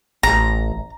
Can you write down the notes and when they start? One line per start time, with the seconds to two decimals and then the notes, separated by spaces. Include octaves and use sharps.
0.23 A1 A#5